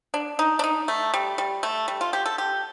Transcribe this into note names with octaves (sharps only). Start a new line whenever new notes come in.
D4
D#4
D4
D#4
A3
G3
G3
A3
G3
F4
G4
A4
G4